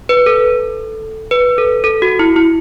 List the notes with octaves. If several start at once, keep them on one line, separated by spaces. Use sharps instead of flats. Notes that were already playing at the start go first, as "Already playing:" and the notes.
B4
A4
B4
A4
A4
F#4
E4
E4